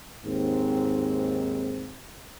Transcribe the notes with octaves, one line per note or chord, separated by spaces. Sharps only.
D#2 G#2 C4